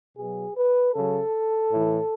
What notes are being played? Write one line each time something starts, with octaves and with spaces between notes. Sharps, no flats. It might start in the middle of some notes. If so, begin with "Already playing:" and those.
B2 F#3 G#4
B4
C#3 F#3 A4
A2 E3